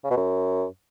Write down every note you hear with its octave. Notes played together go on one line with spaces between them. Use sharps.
C#3
B2
F#2